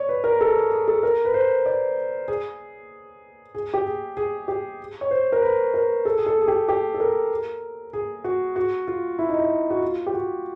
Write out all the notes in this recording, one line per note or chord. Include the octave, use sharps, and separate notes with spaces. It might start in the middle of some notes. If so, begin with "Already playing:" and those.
Already playing: C#5 D5
B4
A#4
A4
G#4
G#4
A4
A#4
B4
C5
D5
G#4
G#4
G4
G#4
G#4
G4
C#5
C5
A#4
B4
A#4
A4
G#4
A4
G#4
G4
G4
A4
A#4
G#4
F#4
F#4
F4
E4
D#4
E4
F#4
F4
G4
F#4